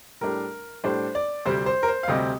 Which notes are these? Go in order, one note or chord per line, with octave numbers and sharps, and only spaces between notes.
A2 G3 D4 A#4
A2 G3 D4 C5
D5
D2 C3 G3 C4 C5
C5
A#4
C5
F5
D2 C3 G3 C4 D#5